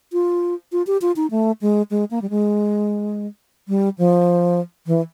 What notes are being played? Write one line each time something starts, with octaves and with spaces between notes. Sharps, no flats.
F4
F4
G4
F4
D#4
A3
G#3
G#3
A#3
G3
G#3
G3
F3
E3